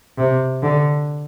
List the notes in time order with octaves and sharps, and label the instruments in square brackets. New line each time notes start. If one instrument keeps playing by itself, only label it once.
[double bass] C3
D3